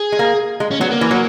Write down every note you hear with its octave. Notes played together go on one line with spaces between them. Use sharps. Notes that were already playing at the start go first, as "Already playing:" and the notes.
Already playing: G#4
G#3
A#3
G#3
C#4
F#3 B3
A#3
E3
F#3